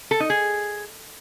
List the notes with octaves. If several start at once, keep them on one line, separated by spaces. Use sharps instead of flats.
A4
D#4
G#4